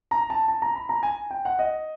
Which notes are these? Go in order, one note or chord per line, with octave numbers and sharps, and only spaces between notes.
A#5
A5
A5
A#5
B5
A#5
G#5
G5
F#5
D#5